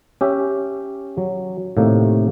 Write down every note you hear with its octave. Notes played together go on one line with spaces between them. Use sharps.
C#4 G4 E5
F#3
A2 C3 D#3 A3 A#3